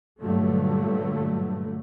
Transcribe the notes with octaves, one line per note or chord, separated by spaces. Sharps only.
G2 A#2 D3 F#3 A3